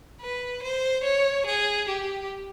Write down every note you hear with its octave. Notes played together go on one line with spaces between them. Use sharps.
B4
C5
C#5
G#4
G4